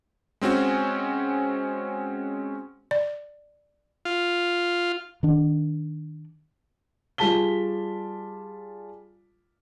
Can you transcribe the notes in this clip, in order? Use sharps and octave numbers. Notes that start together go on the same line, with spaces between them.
G#3 C4 C#4 F#4
D5
F4
D#3 D4
G3 F4 G#4 A5 B6 G7